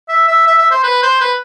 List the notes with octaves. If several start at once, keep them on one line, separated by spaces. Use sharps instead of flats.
E5
E5
E5
E5
C5
B4
C5
B4